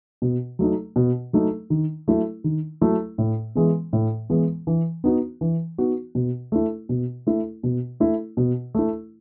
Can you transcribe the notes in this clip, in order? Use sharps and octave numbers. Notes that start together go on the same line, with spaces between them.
B2
F#3 A3 D#4
B2
F#3 A3 D#4
D#3
F#3 A3 E4
D#3
F#3 A3 E4
A2
E3 G#3 B3
A2
E3 G#3 B3
E3
B3 D#4 F#4
E3
B3 D#4 F#4
B2
A3 E4
B2
A3 E4
B2
A3 E4
B2
A3 E4